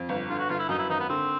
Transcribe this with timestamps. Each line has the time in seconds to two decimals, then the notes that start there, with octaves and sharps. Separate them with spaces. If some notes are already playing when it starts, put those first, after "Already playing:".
Already playing: F2
0.09 G1
0.29 D3 F4
0.39 F#4
0.49 G1 F4
0.59 E4
0.69 F#2 D#4
0.79 E4
0.89 G#1 D#4
1.00 B3
1.09 D3 C4